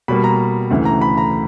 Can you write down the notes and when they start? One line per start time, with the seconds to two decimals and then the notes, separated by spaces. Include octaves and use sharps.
0.08 B2 G3 A#3 B5
0.24 A#5
0.71 D2 C#3 E3
0.85 A#5
1.01 B5
1.18 A#5